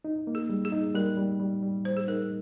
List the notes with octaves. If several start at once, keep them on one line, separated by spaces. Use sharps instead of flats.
D#4
A#3
G#4
G3
G#4
D#4
G3 A#4
G3
G3
G3
G3 C5
G#4
D#4 A#4